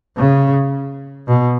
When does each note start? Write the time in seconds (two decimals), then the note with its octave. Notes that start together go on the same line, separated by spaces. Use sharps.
0.18 C#3
1.27 B2